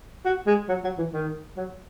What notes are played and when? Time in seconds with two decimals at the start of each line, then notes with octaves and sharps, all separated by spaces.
0.25 F#4
0.47 G#3
0.68 F#3
0.84 F#3
0.98 E3
1.13 D#3
1.57 F#3